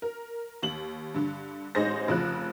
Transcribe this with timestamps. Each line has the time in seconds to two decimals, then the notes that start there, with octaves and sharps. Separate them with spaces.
0.02 A#4
0.63 D#2 F#7
1.14 G2 D3
1.75 A1 G#3 D#4 G#4 C5 A#6
2.08 F1 C#3 F3 F#6